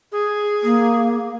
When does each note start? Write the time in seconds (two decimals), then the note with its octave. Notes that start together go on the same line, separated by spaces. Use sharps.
0.12 G#4
0.63 A#3